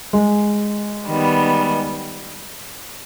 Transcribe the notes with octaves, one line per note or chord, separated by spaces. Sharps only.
G#3
D#3 G3 B3